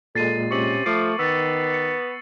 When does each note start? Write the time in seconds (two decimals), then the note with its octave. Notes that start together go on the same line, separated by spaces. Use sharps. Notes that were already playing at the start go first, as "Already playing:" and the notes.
0.15 A#2 G#3 A4 A6 C7 D#7
0.51 C3 C#4 C#6 C#7 F#7
0.86 F3 A3 D6 C7
1.19 D#3 B3 E6 A6
1.74 C#7